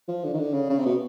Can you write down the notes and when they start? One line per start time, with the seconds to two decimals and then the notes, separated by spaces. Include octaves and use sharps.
0.08 F3
0.24 D3
0.33 D#3
0.39 D3
0.54 C#3
0.69 C#3
0.78 C3
0.86 B2